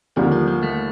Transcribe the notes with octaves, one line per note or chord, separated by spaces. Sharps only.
D#2 D3 F3 G3 A#3
F3
F3
A3